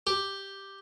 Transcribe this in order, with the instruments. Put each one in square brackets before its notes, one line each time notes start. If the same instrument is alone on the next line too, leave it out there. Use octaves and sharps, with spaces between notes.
[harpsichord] G4